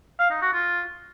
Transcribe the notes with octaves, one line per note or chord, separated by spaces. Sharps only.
F5
D#4
F#4
F4